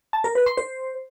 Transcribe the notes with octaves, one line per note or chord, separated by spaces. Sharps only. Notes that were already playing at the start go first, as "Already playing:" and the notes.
A5
A#4
B4
C6
C5